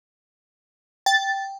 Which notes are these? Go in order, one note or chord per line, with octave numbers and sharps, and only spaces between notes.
G5 A6